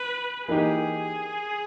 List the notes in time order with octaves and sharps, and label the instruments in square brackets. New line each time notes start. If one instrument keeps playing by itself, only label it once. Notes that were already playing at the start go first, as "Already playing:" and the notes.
Already playing: [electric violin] B4
[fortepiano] E3 A#3 D#4 G4 [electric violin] G#4